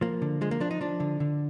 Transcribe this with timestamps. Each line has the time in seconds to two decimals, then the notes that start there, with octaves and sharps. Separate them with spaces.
0.01 F3 A#3
0.22 D3
0.41 F3 G#3
0.51 A#3
0.60 F3 D4
0.71 D#4
0.81 F3 D4
1.00 D3
1.20 D3